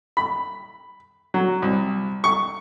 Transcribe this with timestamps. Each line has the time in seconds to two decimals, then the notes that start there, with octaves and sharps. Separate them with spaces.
0.17 B5
1.34 F#3
1.62 C2
2.24 C#6